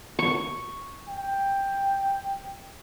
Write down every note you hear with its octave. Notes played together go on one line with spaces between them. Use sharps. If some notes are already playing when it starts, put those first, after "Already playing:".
C#6
G5